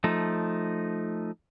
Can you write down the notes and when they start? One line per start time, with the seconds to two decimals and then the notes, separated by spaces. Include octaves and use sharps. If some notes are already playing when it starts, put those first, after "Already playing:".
0.04 F3 A3 D#4